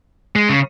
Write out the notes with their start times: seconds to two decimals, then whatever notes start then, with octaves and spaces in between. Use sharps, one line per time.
0.36 G#3
0.49 C#3